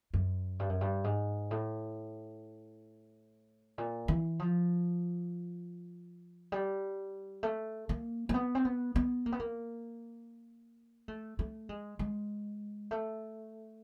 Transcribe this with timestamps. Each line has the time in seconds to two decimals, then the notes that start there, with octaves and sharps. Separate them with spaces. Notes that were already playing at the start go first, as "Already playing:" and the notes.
0.14 F#2
0.59 G2
0.69 F#2
0.81 G2
1.04 G#2
1.51 A2
3.78 A#2
4.08 E3
4.39 F3
6.52 G3
7.43 A3
7.89 A#3
8.29 A#3
8.34 B3
8.55 C4
8.65 B3
8.96 B3
9.26 A#3
9.32 B3
9.40 A#3
11.08 A3
11.39 A3
11.69 G#3
11.99 G#3
12.91 A3